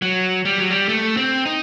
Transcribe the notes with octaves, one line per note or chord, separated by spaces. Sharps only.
F#3
G3
F#3
G3
A3
C4
D#4